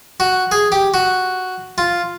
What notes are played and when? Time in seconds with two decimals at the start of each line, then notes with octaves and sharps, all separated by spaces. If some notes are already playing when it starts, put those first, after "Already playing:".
0.20 F#4
0.52 G#4
0.72 G4
0.94 F#4
1.78 F4